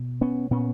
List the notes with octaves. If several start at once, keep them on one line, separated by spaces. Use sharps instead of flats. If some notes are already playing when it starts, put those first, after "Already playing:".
Already playing: B2
B3 C#4
A#2 B3 C#4